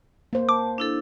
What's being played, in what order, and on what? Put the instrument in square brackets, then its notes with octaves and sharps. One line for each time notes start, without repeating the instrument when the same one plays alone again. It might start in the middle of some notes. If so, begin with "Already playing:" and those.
[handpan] A#3 C5
[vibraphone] A5 [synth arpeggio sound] D6
[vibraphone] D4 E4 A4